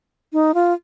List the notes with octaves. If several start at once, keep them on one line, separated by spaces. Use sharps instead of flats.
D#4
F4